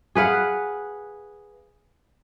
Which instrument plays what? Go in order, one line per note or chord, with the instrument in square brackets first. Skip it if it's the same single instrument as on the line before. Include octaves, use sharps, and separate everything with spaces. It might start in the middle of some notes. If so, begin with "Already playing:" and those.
[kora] G#4 B4 F5 F#5